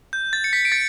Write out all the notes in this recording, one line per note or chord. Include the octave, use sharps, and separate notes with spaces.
G6
A6
C#7
B6
D7
A6 C#7